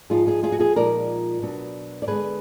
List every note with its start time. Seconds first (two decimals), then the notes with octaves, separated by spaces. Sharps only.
0.10 G#2 F3 B3 D#4 F4 G#4
0.27 F4 G#4
0.43 F4 G#4
0.52 F#4
0.59 F4 G#4
0.76 A#2 F3 G#3 D#4 A#4 D5
1.42 B2 F#3 B3 D4
2.02 D5
2.08 D3 G#3 B3 G#4 B4